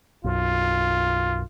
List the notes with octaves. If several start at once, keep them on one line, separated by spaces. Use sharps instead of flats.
B1 F#2 F4